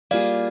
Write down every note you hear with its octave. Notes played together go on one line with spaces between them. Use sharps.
G3 A#3 F4 G#4 D5 F5